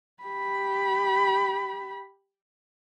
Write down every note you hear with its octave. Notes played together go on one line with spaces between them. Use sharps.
G4 B5